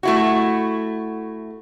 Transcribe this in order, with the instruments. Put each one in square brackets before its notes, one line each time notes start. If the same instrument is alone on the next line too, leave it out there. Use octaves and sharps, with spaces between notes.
[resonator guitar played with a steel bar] A3 E4 F#4